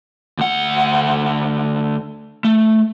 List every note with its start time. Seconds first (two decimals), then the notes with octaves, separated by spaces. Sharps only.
0.39 D2 F#5
2.44 A3